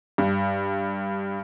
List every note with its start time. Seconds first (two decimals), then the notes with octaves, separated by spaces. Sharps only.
0.18 G2